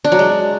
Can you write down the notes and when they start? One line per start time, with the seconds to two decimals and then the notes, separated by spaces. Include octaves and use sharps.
0.04 D4
0.12 F#3
0.19 G#3